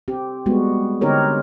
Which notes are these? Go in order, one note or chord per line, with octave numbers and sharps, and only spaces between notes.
C4 G4
G3 G#3 B3 F#4
D3 C4 D#4 G4 A#4 C#5